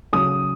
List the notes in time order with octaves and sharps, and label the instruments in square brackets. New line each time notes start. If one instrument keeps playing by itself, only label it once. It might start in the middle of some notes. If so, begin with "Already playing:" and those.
[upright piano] C#3 F#3 C#4 D#6